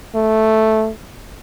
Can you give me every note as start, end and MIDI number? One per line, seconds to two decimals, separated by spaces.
0.15 0.90 57